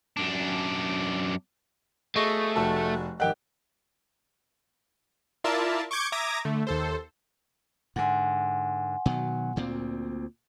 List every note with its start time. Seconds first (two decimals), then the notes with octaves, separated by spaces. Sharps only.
0.17 F#2 D4
2.16 B2 F3 A3 G#4 D#5 C#6 A#6
2.56 F1 G3 G#3 F#4 A4 A5
3.20 G#1 D3 G4 A#4 D#5 F#5 G5 F#6
5.44 E4 F4 A#4 D5 E5 A5
5.91 C#6 D6 G6 G#6 C#7 D7
6.12 E5 A#5 D6 D#6 G#6 A#6
6.45 D3 A3
6.67 D#2 A4 C5
7.96 G#2 D3 F#5 G#5 C6
9.06 B2 D#3 F#3
9.56 D2 A#2 C4